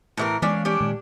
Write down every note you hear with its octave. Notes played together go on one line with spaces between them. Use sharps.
A2 E3 A#4
E3 G#3 C#4 D4 F5
C#4 D4 G4
A#2 D#3 G#3